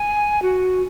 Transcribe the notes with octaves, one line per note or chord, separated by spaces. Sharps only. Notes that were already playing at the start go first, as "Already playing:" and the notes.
Already playing: G#5
F#4